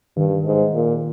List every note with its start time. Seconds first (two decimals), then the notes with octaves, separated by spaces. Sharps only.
0.17 G2 D#3
0.45 G#2
0.74 A#2